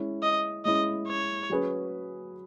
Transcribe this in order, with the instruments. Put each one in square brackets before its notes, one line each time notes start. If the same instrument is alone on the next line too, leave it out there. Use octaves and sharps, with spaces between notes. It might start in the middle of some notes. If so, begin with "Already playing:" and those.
Already playing: [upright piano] G#3 C#4 E4
[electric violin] D#5
[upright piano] G#3 C#4 E4 [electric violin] D#5
[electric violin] C#5
[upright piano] F#3 C#4 G#4 B4